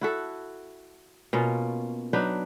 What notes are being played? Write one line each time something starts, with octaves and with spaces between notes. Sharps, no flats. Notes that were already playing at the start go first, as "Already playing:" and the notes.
E4 F#4 A4
B2 A#3 C#4 F4
F#3 D4 D#4 B4